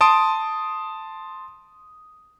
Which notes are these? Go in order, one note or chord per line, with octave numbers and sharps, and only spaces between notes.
A5 C6 D#6 D7